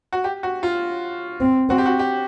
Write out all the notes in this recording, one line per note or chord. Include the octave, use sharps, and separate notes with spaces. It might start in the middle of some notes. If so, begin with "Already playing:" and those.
F#4
G4
F#4
F4
C4
C4 F#4
G4
F#4
G4